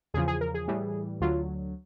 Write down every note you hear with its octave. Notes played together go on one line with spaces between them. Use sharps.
E2 C#3 F3 G#4
G#4
A#4
G#4
A2 E3 G3
D2 D3 F#3 F4